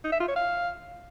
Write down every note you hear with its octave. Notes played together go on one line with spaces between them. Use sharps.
D#4
E5
F4
C#5
F5